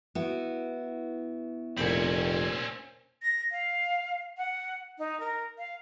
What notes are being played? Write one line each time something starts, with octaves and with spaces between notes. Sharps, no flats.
B3 E4 F#4
F1 A#2 C4 C#4 B5
A#6
F5
F#5
D#4
A#4
F5